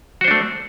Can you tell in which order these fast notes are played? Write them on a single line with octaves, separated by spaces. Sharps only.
F#4 C5 D4 A3